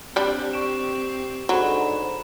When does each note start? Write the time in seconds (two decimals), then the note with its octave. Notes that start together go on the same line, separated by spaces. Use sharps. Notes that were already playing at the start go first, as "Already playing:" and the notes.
0.16 G3 C4 D4 G4
0.53 C#6 D7 E7
1.49 G#2 D3 F#3 A#5 B5 E7